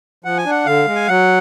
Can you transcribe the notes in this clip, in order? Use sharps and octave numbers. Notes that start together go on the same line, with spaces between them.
F3 F#5
G#5
D4
F#5
D3 F5
G#3
G#5
F#3 F#5